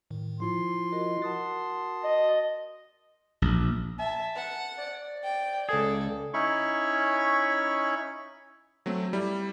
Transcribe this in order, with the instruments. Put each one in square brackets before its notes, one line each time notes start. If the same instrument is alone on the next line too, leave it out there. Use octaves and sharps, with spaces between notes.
[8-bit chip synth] A2 D#3
[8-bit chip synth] F3 E4 F4 [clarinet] C6
[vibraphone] F#4 A#4 D#5
[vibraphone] F#4 A#4 F#5 [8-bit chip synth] A5 D#6 A6
[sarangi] D#5
[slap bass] A#1
[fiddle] E5 [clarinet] A5
[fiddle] F#5
[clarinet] D5
[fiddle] G5
[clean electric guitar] C#2 G#4 [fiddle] A4
[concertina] C#4 D#4 E4 C#5 B5 C#6
[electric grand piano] F#3 A3 C4
G3 E4